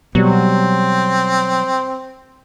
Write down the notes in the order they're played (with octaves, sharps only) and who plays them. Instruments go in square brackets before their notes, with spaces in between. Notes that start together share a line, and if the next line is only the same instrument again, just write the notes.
[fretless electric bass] B2 G3 [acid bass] F#3 [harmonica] C4